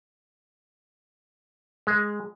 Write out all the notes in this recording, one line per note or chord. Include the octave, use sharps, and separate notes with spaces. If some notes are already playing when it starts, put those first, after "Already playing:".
G#3